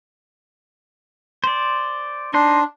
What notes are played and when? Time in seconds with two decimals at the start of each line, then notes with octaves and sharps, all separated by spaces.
1.44 C5 D5
2.34 D4 D#4 C5 C6